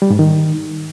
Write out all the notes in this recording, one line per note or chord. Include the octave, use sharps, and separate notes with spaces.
G3
G#2
D#3